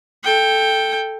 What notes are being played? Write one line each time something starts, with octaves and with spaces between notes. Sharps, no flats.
A4 G5